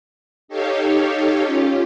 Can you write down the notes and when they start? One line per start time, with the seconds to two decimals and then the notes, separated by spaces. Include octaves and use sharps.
0.48 D#4 G4 A4 C#5 F5
1.44 C#4 F4 G4